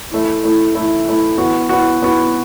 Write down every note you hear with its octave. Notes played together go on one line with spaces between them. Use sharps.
E3 A3 E4
E3 A3 E4
E3 A3 E4
E3 A3 E4
E3 B3 F#4
E3 B3 F#4
E3 B3 F#4